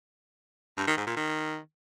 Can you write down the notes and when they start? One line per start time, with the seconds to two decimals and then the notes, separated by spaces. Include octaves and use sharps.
0.78 G2
0.88 D#3
0.97 G#2
1.07 A#2
1.17 D#3